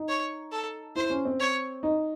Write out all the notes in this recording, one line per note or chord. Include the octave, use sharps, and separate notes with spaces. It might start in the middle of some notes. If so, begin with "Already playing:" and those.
Already playing: D#4
C#5
A4
E4 C5
C#4
C4
C#5
D#4